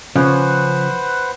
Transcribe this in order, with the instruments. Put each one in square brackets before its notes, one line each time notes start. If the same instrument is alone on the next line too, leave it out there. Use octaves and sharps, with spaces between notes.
[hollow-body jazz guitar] C#3 F3 C#4 [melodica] B4 C5 F#5